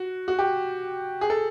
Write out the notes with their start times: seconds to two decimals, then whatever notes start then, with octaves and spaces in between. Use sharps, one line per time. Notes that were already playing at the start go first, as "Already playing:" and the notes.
Already playing: F#4
0.28 F#4
0.39 G4
1.21 G#4
1.30 A4